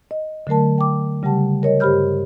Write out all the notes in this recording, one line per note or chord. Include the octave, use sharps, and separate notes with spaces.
D#5
D3 F#3 A3 A#4 A5
G5 D6
C#3 G3 G4 F#5 A5
A#4 C#5 D#5
G2 G4 C5 B5 F6 G6